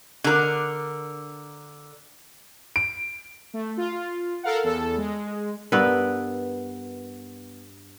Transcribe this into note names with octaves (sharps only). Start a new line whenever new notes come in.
D3 A#4
D7
A3
F4
A4 A#4 F5 F#5
E2 A4
G#3
G2 B3 A#4 B4